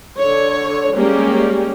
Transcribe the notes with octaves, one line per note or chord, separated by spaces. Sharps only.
D3 C#5
G3 G#3 A#3 C#4 G4